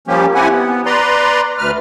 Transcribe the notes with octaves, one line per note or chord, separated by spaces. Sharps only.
F3 G3 A#3 C#4 G4
C4 E4 G4 F#5 G#5
B3
B4 D5 A#5 C6
D2 B4 F6